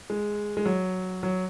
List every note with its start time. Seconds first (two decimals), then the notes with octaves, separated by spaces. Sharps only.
0.10 G#3
0.57 G#3
0.66 F#3
1.23 F#3